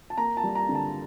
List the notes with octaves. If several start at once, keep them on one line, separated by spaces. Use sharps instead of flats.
A5
A#3 A#5
A5
G3
A#5
D3
A5